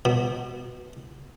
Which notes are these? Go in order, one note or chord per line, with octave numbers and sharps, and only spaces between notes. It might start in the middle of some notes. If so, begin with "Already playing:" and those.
B2